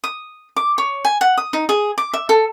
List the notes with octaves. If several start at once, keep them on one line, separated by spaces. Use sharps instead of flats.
D#6
D6
C#5
G#5
F#5
D#6
D#4
G#4
D6
E5
A4